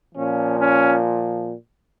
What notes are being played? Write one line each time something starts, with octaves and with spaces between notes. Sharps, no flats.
A#2 F3 C#4
C#4